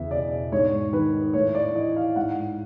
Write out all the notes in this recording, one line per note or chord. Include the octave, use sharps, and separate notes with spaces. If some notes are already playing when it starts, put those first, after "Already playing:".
Already playing: E2 C#3 E5
B2 D5
G#2 C#5
D#3 B4
A2 C#5
D5
E3 D#5
F5
G#2 F#5